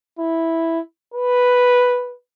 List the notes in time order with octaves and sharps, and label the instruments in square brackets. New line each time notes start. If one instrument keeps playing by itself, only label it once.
[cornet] E4
B4